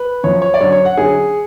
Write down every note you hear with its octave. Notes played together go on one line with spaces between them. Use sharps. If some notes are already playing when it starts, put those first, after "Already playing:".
Already playing: B4
F#2 F3 C#5
C#5
D5
F#2 D3 F#3 C#5
C#5
F#5
F#2 D3 F#3 G#4